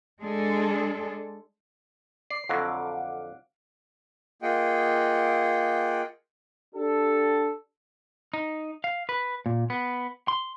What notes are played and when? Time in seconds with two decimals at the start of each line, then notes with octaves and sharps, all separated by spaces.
0.21 G#3 D4 G#4 A4 D5
2.30 D5 C7
2.49 F2 D3 F#3 F5 F#5 D6
4.42 A#3 F4 G#4 D#5 F#5 G5
6.75 D4 G4 A4
8.34 D#4
8.84 F5
9.09 B4
9.46 A#2
9.70 B3
10.28 C6